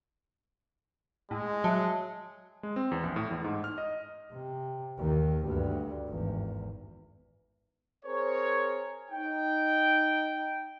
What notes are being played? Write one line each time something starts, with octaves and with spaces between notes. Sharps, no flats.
A2 G#3
F#3 D#5 E5 A5
G#3
C4
E2
A#1
A2
E2
G#2
F6
D#5
C3
D#2 D#3
D2 G2
G#1 E2
C4 G#4 A#4 C5 C#5
D#4 G5